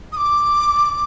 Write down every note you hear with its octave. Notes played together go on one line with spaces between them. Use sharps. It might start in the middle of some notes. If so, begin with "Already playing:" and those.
D#6
D6